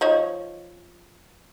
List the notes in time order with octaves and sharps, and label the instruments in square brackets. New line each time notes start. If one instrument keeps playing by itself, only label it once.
[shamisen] F3 D#4 C#5